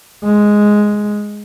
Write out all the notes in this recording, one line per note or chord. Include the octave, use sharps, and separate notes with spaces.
G#3